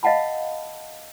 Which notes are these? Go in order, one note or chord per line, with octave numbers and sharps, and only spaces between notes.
D#5 F5 F#5 A5 B5